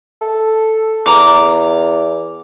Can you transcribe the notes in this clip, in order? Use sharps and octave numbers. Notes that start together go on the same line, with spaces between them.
A4
E2 A#5 D6